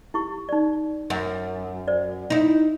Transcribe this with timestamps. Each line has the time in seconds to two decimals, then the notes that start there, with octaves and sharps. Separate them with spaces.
0.14 E4 G4 C#6
0.49 D#4 D5
1.10 F#2
1.88 C5 D5
2.30 D#4 E4